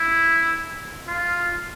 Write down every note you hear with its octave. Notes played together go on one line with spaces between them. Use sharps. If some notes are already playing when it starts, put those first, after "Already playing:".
Already playing: E4
F4